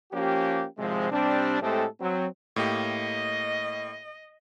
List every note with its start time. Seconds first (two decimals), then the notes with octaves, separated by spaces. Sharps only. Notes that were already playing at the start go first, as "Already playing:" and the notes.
0.12 F3 A#3 C#4 G4
0.78 G#1 C3 F3 G#3
1.11 C3 G3 C4 D4
1.62 A2 G#3 A3 C4 G4 A4
2.00 F#3 C4
2.56 A2 A#3 G4 D#5